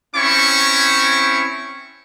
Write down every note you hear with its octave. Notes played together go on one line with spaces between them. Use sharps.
C4 C#4 E4 C#5 C#6